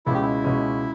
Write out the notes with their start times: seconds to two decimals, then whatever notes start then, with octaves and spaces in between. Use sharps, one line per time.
0.06 C#2 B2 G#3 C#4 E4
0.14 G4
0.22 E4
0.44 C#2 B2 G#3 C#4